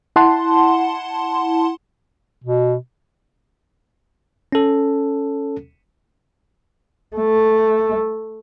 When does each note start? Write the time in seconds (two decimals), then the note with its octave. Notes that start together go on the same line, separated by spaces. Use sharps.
0.16 E4 F#5 A5 C6
2.44 B2
4.52 C#4 A4
7.17 A3